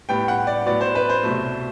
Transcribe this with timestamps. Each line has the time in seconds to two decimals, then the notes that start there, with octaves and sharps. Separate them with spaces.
0.09 A2 G3 B3 G5
0.28 F#5
0.47 D5
0.66 A2 F#3 B3 D5
0.81 C5
0.95 B4
1.09 C5
1.23 C2 B2 F#3 A3